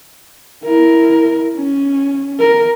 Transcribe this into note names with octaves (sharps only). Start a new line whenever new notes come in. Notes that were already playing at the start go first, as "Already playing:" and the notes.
E4 A#4
C#4
A#4